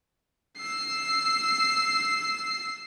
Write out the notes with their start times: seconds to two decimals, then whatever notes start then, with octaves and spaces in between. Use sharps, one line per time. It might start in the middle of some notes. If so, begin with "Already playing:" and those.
0.58 E6 C7